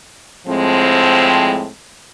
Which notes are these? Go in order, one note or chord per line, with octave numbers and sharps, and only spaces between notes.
A2 F3 G#3 C4